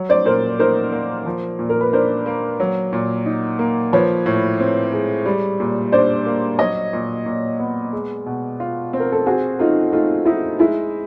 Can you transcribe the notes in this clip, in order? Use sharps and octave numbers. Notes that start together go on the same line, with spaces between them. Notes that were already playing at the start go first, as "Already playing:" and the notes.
Already playing: F#3
C5 D5
A#2 A#4 C5
D#4 A#4 C5
A#3
F3
A#2
A#4
B4
D4 A#4 C5
A#3
F#3
A#2
D#4
A#3
F3 B4 C#5
A2
C4
G#3
G3
A#2
D4 C5 D5
A#3
F#3 C#5 D#5
A#2
A#2
B3
G#3
B2
F4
C4
A#4
A4
C4 F#4 G#4
A3 D#4 F4
A3 D#4 F4
D#4 E4
G#3 E4